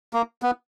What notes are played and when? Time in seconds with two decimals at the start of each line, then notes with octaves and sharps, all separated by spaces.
0.13 A#3
0.42 B3